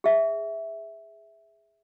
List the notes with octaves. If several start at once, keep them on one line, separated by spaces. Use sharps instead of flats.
G#4 E5